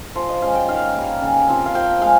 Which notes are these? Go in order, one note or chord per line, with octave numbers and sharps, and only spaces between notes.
F3 C5
D#5
G#3 C#4 F5
G5
D#3 F5
G3 A#3
C#3
F3 C4
F5
F3 G5
G#3 F5